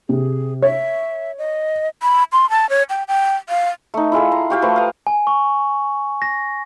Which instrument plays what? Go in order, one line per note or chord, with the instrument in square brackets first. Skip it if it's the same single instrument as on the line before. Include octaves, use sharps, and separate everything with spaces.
[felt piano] C3 [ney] G#4
[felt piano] C#5 [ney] E5
[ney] D#5
B5
C6
A5
C#5
G5
G5
F5
[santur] A3 D#4
E4 F4 G#4 A4
A#5 C6
F#4 G4 F5
F3 A3 B4 A#5
F5 D#6
[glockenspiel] G#5
C#6
A#6